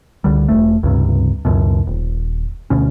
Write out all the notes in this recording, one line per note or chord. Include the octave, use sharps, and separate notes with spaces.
C#2 D3 G3
E1 A3
C#2 G2 C3
C#2 F#2 B2
D#1
D2 B2 C#4